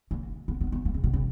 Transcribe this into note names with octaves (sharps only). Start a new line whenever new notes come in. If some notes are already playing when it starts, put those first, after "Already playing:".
A#3
B3
B3
B3
A#3
C#3
B2
C#3